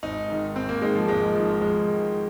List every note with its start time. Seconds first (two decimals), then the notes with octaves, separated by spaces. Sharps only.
0.03 G#1 D#4
0.29 G#2 D#3
0.56 G#1 C4
0.69 A#3
0.82 G#2 D#3 G#3
0.95 F3
1.08 G#1 G#3
1.35 G#2 D#3 F3
1.61 G#1 G#3
1.88 G#2 D#3